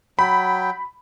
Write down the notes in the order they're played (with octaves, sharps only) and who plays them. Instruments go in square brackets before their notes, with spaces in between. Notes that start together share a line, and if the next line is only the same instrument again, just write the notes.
[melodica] F#3 G5 [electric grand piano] B5